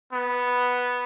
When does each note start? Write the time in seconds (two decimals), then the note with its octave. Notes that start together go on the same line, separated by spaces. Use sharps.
0.13 B3